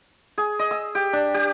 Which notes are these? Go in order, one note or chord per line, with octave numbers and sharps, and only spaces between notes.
G#4
D#5
E6
G4
D4
G4